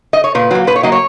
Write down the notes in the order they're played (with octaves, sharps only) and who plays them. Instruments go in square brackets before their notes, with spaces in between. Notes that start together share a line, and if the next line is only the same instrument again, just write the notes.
[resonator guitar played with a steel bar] D#5
C#5
A#2 B4
F#3 A#3
A#2 B4
C#5
F#3 A#3 D#5
C#5